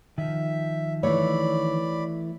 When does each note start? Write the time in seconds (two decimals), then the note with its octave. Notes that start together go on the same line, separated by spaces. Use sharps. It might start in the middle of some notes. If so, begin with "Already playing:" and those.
0.18 D#3 F3 E5
1.03 E3 A3 C#5 D5 B5